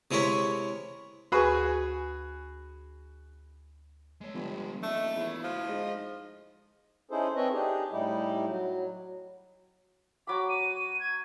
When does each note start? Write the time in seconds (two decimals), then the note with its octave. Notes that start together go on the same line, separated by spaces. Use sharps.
0.11 C3 G#3 E4 A#4 C#5 B5
1.32 D2 F#4 G#4 B4 G#5
4.21 G#3 C#5
4.35 G1 F3 G#3
4.83 D#1 A3 D4 D#5
5.17 E2 E4 F4
5.44 D2 F3
5.68 G#2 D#5
7.11 C#4 D#4 E4 G#4 A4 C5
7.36 C4 A4 B4 C#5 D#5 E5
7.53 D4 D#4 G4 G#4
7.92 A2 G3 D#4 E4 G4
8.48 F#3
10.27 F#3 B5 D6
10.49 D#7
11.00 G#6